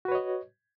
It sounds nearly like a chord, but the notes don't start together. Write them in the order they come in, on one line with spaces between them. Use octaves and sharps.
F#4 B4 C#5 D#5